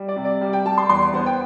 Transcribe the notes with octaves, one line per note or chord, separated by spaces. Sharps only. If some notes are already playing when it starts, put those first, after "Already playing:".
Already playing: G3
D5
C3
D5
G3
G5
G3 A5
C6
E2 C6
B3 C5
G5